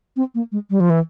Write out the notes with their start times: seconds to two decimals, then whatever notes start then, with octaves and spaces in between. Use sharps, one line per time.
0.16 C4
0.35 A#3
0.52 G#3
0.70 G3
0.80 F3
0.90 E3